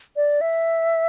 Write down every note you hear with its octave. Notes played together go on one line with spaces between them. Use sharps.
D5
E5